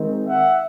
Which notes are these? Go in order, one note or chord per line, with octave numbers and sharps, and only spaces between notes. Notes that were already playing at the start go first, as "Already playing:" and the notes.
Already playing: D#3 G#3 C4
E5 F#5